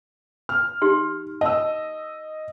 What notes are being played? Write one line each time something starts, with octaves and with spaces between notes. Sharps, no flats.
F6
D#4 G4 C6
D#5 A5 E6